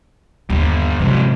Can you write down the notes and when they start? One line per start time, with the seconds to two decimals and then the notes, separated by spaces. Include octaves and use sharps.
0.50 D#2 D3 G3
0.99 G#2 C3 F3 F#3